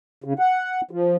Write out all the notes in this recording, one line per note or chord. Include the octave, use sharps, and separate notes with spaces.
C#3
F#5
F3